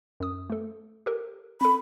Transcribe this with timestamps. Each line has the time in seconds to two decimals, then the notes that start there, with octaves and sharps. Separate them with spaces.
0.20 F#2 D#6
0.50 A3 A4
1.06 G4 A4 A#4
1.61 C4 A4 B5